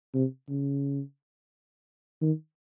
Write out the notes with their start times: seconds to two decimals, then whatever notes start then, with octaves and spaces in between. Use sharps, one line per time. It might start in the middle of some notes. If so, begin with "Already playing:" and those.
0.15 C3
0.49 C#3
2.22 D#3